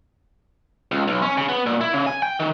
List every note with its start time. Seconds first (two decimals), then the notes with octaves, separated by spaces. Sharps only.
0.92 C#2
1.08 B1
1.22 C#4
1.38 C#3
1.49 B3
1.66 A#2
1.81 E4
1.94 C#3
2.06 G#5
2.23 G5
2.40 D#3